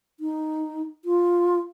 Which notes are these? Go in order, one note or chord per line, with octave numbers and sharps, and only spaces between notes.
D#4
F4